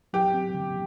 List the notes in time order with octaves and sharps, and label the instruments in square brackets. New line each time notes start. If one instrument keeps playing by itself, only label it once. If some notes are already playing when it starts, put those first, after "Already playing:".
[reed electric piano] F#3 [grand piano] G4
[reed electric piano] C4
D3